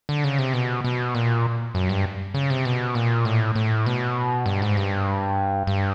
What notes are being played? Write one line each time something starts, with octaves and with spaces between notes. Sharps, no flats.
D3
C#3
C3
B2
B2
A#2
F#2
G2
C#3
C3
B2
A#2
A2
A2
B2
G2
G#2
G2
G2